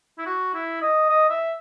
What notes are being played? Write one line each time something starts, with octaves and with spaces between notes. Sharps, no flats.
E4
F#4
E4
D#5
D#5
E5